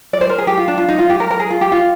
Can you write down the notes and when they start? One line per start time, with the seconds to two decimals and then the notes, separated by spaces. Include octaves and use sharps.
0.13 D5
0.21 C5
0.30 A#4
0.38 G#4
0.47 G4
0.57 F4
0.68 D4
0.78 F4
0.89 D#4
0.99 F4
1.10 G4
1.20 A#4
1.30 A#4
1.40 G#4
1.50 F4
1.61 G4
1.72 F4